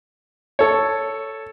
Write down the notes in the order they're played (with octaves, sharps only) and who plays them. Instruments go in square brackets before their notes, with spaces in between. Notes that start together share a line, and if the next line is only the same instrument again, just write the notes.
[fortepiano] A4 C#5